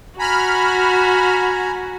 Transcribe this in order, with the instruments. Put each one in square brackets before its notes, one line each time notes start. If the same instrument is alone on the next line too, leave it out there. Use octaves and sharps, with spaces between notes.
[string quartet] F#4 [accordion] G#5 A#5 [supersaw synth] B5 F6